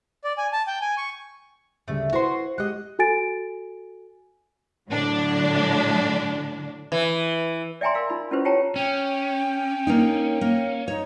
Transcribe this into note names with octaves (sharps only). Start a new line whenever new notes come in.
D5
G#5
A5
G5
G#5
C#6
D2 C#3 G3 A3
E4 F#4 B4 C5 C6
G#3 G4 D#5 F#5
F#4 A4 G#5 A6 D7
A2 D3 F#3 D4
E3
D5 E5 G5 G#5 A#5 C6
A#4 F5 A#5
D#4 F4 B5
C#4 E4 F4 G4 B4 C5
F4 G4 C#5 G5 A5 A#5
C#4 G5
A#3 D4 D#4
A#3
D#4 C#5